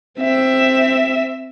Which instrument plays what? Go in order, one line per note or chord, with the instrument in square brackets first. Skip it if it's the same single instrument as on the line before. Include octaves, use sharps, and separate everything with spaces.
[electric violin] C4 E5